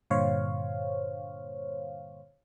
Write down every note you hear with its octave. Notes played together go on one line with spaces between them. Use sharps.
G2 A#2 D3 C5 C#5 F5